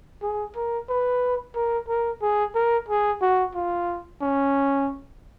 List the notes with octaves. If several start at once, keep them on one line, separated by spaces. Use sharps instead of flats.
G#4
A#4
B4
A#4
A#4
G#4
A#4
G#4
F#4
F4
C#4